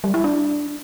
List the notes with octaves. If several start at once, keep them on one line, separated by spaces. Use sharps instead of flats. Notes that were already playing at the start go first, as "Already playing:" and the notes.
G3
E4
D4